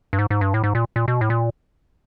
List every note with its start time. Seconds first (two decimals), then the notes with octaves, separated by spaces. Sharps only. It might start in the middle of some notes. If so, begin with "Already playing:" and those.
0.13 G2
0.19 G#2
0.30 G#2
0.41 G2
0.54 A2
0.64 G#2
0.75 A#2
0.96 A#2
1.08 B2
1.21 A2
1.30 A#2